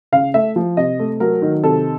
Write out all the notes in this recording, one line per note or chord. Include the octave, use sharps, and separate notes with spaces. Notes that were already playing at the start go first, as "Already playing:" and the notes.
C#3 F5
A3 E5
F3
C3 D#5
A3
F#3 A#4
D#3
C3 A4